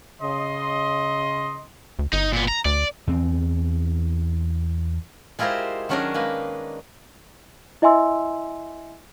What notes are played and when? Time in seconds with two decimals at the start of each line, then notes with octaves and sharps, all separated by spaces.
0.21 C#3 D#5 C6
1.99 D2
2.13 G1 D#4
2.33 A#2 B3
2.48 A#5
2.65 D2 D5
3.07 E2 C4
5.39 G#3 E4 F4 G4 A#4 C5
5.89 D#3 F#3 C#4 D4 G#4 A#4
6.14 G#3 A#3 A#4 B4
7.82 E4 D#5 E5 G#5 C6 E6